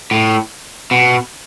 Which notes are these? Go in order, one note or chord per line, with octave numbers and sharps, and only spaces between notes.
A2
B2